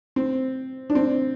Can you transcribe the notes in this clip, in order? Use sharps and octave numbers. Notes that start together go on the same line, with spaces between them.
C4
D4
C4